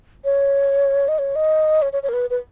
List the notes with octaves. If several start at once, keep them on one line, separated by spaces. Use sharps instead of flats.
C#5
D#5
C#5
D#5
C#5
C#5
C#5
A#4
B4
B4